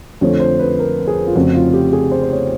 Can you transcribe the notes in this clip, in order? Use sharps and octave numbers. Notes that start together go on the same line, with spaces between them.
F2 D3 F3 A3 C#5
C5
B4
A#4
G#4
F4
F1 F2 C#3 F#4
F4
G4
G#4
C5
C5
C#5